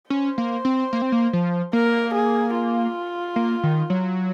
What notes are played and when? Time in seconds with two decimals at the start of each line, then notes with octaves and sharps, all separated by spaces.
0.10 C#4 C5
0.38 A#3
0.65 C4
0.93 A#3
1.02 C4
1.12 A#3
1.33 F3
1.73 A#3 A#4
2.15 G#4
2.55 F4
3.36 A#3
3.63 D#3
3.90 F#3